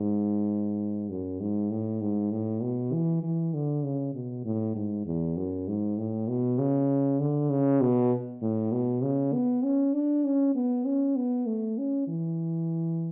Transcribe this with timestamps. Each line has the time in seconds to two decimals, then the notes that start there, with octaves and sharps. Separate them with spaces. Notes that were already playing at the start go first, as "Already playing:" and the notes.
Already playing: G#2
1.10 F#2
1.40 G#2
1.71 A2
2.02 G#2
2.32 A2
2.62 B2
2.93 E3
3.23 E3
3.54 D3
3.84 C#3
4.15 B2
4.45 A2
4.76 G#2
5.06 E2
5.37 F#2
5.68 G#2
5.98 A2
6.28 B2
6.59 C#3
7.20 D3
7.50 C#3
7.81 B2
8.42 A2
8.72 B2
9.03 C#3
9.33 B3
9.63 C#4
9.94 D4
10.25 C#4
10.55 B3
10.85 C#4
11.16 B3
11.47 A3
11.78 C#4
12.08 E3